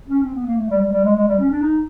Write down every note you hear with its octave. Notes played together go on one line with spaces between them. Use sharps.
C#4
C4
B3
A#3
A3
G3
G3
G3
G#3
G#3
G3
C#4
D4
D#4